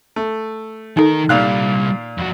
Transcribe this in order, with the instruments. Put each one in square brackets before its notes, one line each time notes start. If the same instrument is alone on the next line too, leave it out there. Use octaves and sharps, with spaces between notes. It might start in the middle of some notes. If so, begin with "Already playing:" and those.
[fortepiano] A3
[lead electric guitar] D#3 A#4 [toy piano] D#4 A4
[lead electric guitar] C2 G3 [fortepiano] A#2 F5 F#6
[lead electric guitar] F2 F#4